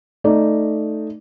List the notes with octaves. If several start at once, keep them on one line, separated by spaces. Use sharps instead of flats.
A3 D#4 D5